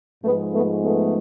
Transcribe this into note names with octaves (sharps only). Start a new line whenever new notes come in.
G#2 F3 G#3 A3 B3
A3 B3
A3 B3